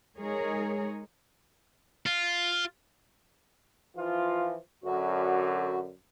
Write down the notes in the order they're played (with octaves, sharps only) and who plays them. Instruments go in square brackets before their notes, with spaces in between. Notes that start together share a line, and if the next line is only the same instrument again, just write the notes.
[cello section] G#3 D#4 G#4 A#4 C#5
[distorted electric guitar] F4
[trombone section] E3 F3 F4
[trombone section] F#2 D3 [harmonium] F#4